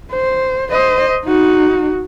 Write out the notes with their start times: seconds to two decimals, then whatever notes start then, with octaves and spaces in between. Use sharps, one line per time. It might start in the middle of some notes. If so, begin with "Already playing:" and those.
0.12 C5
0.71 C5 D#5
1.25 D#4 F#4